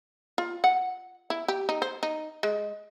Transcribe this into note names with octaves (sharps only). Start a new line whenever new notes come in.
F4
F#5
E4
G4
D#4
C5
D#4
G#3